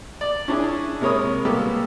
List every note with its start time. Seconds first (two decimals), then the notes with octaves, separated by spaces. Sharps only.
0.21 D5
0.48 C#4 D4 E4 G#4
1.01 C3 G#3 A#4 C#5 B5 D#6
1.45 G3 G#3 A#3 B3 G4 A4